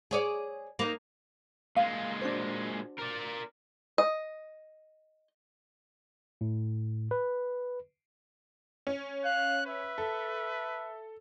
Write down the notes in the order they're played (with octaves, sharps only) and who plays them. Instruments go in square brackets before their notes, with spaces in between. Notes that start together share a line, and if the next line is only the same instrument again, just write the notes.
[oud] G#4 C#5 D5
A#3 D#4
[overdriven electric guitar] A#2 G#3 [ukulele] F5
[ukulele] D4 F#4 C5
[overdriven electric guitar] A#4 D5
[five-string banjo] D#5
[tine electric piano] A2
B4
[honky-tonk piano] C#4
[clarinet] F5 [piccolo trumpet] F#6
[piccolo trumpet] B4 [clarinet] E5
[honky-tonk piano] A4